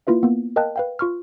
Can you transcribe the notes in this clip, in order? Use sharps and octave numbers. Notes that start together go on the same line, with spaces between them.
A#3 E4 F4 B4 E5
A#3 B3
A#4 D#5 F5 G5 A5 F#6
B4 F5 G5
F4 C#6 F6